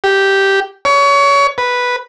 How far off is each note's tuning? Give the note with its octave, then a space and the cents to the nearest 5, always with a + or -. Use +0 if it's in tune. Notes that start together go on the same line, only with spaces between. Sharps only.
G4 -5
C#5 +25
B4 -5